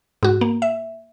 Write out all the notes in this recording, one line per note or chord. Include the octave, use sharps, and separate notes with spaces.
G#2 F#4
A#3
E5